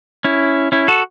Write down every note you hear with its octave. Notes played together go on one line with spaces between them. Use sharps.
C#4 E4
C#4 E4
F#4 A4